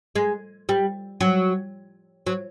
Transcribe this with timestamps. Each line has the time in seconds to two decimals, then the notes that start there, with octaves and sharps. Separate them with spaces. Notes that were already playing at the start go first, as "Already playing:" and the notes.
0.15 G#3
0.69 G3
1.20 F#3
2.27 F#3